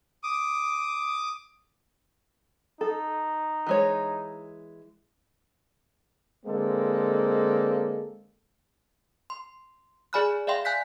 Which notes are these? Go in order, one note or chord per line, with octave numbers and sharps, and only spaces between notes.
D6 D#6
D#4 A4
E3 G#3 C#5
D3 G#3 A#3 C4 A4
C6
G#4 D5 G#5 B5 F6 F#6
D5 E5 F5 G5 C6
G#5 F#6 G6 B6